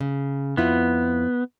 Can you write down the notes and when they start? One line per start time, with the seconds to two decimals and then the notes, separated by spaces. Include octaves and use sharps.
0.01 C#3
0.57 F2 B3 E4 F4